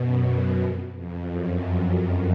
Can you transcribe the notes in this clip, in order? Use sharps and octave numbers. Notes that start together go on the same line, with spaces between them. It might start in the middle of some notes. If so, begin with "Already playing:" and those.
Already playing: F#2 B2
F2
F2
F#2